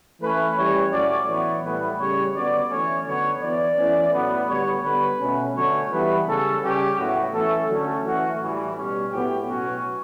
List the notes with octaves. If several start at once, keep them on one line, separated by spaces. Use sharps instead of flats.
E3 A3 C#4 B4
E3 G3 C#4 C#5
A2 F#3 C#4 D5
E3 B3 C#5
A2 E3 G3 B3 B4
C#3 G3 C#4 C#5
D3 F#3 B3 D5
E3 A3 C#4 C#5
D3 F#3 B3 C#5
E3 B3 D5
E3 A3 C#4
A2 F#3 B3
D3 G3 B3 C#5
D3 G3 B3 B4
B2 A3 C#4
D3 F#3 A3 C#4 C#5
E3 G3 B3 B4
C#3 G3 C#4 A4
C#3 G3 C#4 G4
A2 F#3 B3 F#4
E3 A3 C#4 A4
D3 F#3 A3 C#4
E3 A3 C#4 F#4
A2 E3 G3
B2 G3 C#4
A2 F#3 B3 G4
B2 F#3 C#4 F#4